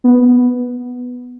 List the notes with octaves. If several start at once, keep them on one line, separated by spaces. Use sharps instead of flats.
B3